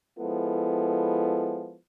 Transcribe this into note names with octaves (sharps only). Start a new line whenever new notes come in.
F3 G#3 B3 E4 A4